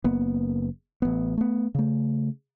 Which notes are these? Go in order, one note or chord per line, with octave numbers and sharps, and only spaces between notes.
F#1 A#3 B3
A1 B3
A3 B3
C#3 A3